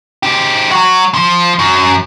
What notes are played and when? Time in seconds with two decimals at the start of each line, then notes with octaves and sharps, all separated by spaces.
0.23 G#3 G4
0.71 F#3 F#4
1.14 F3
1.59 F#2